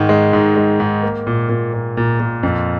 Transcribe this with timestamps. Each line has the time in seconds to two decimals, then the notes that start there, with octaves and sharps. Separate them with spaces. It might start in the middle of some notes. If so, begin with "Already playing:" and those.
Already playing: G#2 D#3
0.09 G#3
0.33 G#2
0.57 G#3
0.80 G#2
1.03 A#3
1.27 A#2
1.49 A#2
1.73 A#2
1.97 A#2
2.20 A#2
2.43 F2